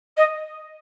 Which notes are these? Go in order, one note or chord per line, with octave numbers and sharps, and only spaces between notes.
D#5